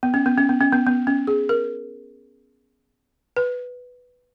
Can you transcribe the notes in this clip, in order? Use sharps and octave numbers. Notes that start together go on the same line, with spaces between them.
B3
C#4
B3
C#4
B3
C#4
B3
B3
C#4
G#4
A#4
B4